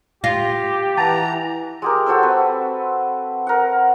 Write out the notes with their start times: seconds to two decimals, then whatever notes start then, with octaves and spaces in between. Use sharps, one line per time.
0.24 F4 G4 A#6
0.97 E3 F#5 A5 A#5 A6
1.82 G#3 G4 A#4
2.06 F#4 A4 C5 E6
2.23 C4 B4
3.47 A#4 F#5